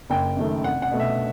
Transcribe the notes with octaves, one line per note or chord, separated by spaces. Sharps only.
F#1 G5
F#2 D#3 A3
C2 F#5
F#5
B2 A3
E5